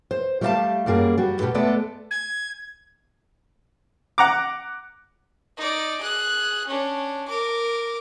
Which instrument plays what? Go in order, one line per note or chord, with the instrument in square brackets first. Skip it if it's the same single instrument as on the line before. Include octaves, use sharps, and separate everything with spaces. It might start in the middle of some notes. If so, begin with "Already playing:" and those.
[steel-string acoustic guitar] C5
G3 A3 G4 D5 F5 A5
F#2 G3 A#3 G#4 A#4
G3 F#4
B2 G4 A4 B4
G#3 A3 B3 A4 D5
[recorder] G#6
[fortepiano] F#5 A#5 D6
[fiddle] D#4 D5
G#4 F#6
C#4 D4
A#4 D6